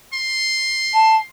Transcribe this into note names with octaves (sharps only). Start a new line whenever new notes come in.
C6
A5